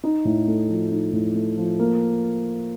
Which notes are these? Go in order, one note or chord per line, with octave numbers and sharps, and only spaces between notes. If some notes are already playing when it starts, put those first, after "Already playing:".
D#4
A2
A3
F3
D#4
A2
A3
F3
A#3